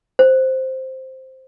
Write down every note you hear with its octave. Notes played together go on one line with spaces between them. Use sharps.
C5